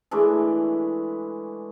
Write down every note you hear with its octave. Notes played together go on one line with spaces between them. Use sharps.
E3 G#3 A3 D4